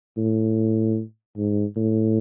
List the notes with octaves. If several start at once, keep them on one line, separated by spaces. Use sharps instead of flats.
A2
G#2
A2